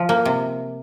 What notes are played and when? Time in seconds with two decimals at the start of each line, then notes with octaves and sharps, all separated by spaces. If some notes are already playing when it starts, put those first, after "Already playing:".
Already playing: F3
0.09 A#3
0.25 C3